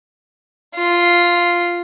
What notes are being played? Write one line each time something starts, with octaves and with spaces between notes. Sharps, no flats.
F4